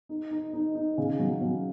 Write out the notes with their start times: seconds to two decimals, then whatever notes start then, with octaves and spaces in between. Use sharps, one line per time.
0.09 D#4
0.31 D#4
0.53 D#4
0.75 D#4
0.98 C#3
1.20 F#3
1.41 F#3